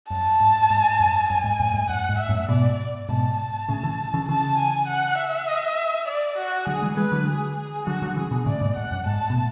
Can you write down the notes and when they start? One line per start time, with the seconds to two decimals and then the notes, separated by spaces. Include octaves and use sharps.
0.10 F#2 A5
0.40 G#2
0.70 G#2
1.00 F#2
1.29 F#2 G#5
1.44 G#2
1.60 F#2 A2
1.74 G#2
1.89 F#2 F#5
2.09 G#2
2.19 E5
2.29 F#2 A2
2.49 G#2 B2 D5
3.09 G#2 B2 A5
3.39 A5
3.69 A2 C#3
3.83 C#3 E3
4.14 C#3 E3
4.28 C#3 E3 A5
4.58 G#5
4.88 F#5
5.18 E5
6.07 D5
6.38 F#4
6.67 D3 F#3 G#4
6.82 E3 G#3
6.97 E3 G#3 B4
7.12 D3 F#3
7.28 G#4
7.58 G#4
7.87 D3 F#3 F#4
8.02 D3 F#3
8.16 C#3 E3 G#4
8.31 B2 D3
8.46 A2 C#3 D5
8.61 G#2 B2
8.77 G#2 F#5
8.91 F#2
9.06 G#2 A5
9.30 B2
9.36 A2